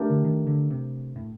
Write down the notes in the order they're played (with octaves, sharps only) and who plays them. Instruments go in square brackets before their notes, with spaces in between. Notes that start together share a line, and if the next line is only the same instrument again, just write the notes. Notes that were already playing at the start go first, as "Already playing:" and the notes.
Already playing: [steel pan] A3 D4 G4 A#4
[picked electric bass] D3
D#3
D3
C3
A2